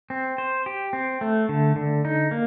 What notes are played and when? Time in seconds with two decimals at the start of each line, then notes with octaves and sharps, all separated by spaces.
0.10 C4
0.38 C5
0.66 G4
0.93 C4
1.21 A3
1.49 D3
1.76 D3
2.05 D#4
2.31 A#3